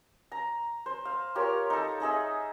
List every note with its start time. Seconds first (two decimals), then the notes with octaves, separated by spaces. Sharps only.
0.32 A#5
0.86 C5
1.05 F5
1.35 F4 G4 A#4 C#5
1.70 D#4 A4
2.00 D#4 G#4 D#5 E5